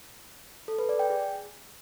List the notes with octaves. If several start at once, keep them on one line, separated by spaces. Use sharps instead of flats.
A4
B4
D5
G5
G#4